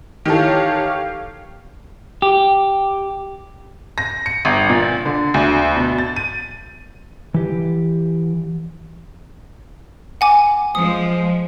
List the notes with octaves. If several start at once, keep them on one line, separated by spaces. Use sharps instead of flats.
D#3 E3 G4 A4 C#5 F5
G4
A#6
C#7
G1
A#2
D3
D2
B2
A6
D#7
E3 G4
F#5 G#5 D6
F3 G#3 D#6